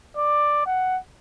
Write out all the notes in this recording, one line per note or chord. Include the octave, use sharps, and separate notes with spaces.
D5
F#5